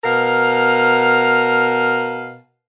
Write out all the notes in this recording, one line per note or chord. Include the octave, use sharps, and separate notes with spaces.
B2 A#4 F5